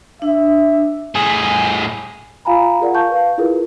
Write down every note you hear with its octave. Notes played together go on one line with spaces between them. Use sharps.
D4 E5
A2 G#4
F4 F5 G#5 A#5 B5
F4 G#4 A#4 D5 F#5
F5 A5 C#6 G6
B4 F5
E4 F4 G#4 A#4 B4